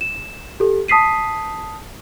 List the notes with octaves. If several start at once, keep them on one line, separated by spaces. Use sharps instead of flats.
E7
G4 A4
A5 D#6 B6 C7 D#7